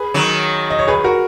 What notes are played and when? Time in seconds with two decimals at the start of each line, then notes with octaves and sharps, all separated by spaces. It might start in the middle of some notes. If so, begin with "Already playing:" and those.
Already playing: G#4 B4
0.14 D#3 F#3
0.70 D#5
0.79 C#5
0.87 G#4 B4
1.04 F#4 A#4